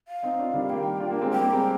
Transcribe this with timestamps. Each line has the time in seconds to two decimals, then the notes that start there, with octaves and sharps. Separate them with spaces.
0.08 F5
0.23 C4 D#4
0.38 D4 F4
0.54 D#3 G3
0.69 G3 A#3 G5
1.00 D4 F4
1.10 A#3 D4
1.21 G#3 C4
1.31 G3 A#3 G5
1.42 G3 A#3
1.52 G#3 C4